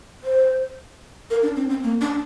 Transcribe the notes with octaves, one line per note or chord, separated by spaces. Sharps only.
C5
A#4
D4
C4
C4
A#3
D4